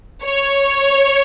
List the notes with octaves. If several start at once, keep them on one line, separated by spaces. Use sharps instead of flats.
C#5